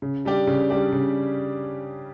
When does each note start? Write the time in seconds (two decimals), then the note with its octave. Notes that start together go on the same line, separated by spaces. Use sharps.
0.02 C#3
0.25 G3 D4 G4 D5
0.47 C#3
0.70 G3 D4 G4 D5
0.92 C#3